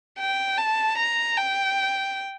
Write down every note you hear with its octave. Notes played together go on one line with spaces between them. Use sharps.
G5
A5
A#5
G5